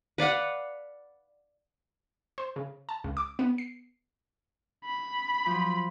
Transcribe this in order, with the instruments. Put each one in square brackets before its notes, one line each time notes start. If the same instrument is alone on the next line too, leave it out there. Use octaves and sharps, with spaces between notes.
[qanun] B4 D5 F5 F#5
[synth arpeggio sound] C5
C#3
A5
C#2
D6
B3
C7
[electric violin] B5
[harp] F3 F#3